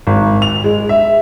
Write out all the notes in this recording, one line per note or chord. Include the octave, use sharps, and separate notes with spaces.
G#1
F7
G#3
E5